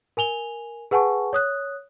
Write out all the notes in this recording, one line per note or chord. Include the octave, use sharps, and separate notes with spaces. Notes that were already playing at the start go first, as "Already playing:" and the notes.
A#4 G#5 F7 G7
G#4 B4 F#5 G#5 A5 C#6
C#5 D#6 F#6